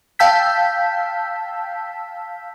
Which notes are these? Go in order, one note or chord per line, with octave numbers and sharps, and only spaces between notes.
F5 G5 A5 E6 G6 B6